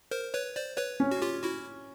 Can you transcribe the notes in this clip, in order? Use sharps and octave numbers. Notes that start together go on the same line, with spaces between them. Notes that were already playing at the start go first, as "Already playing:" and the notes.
A#4 C5
B4 C#5
C5 D5
B4 C#5
C#4
F#4
F4 G4
E4 F#4